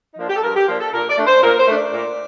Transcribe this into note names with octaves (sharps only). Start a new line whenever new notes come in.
D#4
F3 A#3 D4 F4
G4
A4
G2 A#4
G4
F3 A#3 D4 F4
A4
A#2 A#4
D5
A3 D4
C5
A#2 A#4
C5
A3 D4
D5
A#2